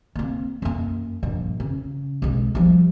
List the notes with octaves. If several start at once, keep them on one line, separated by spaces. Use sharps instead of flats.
A#3 C4
F#2 A#3
A#1 G2
C#3
B1 G#3
F3 G3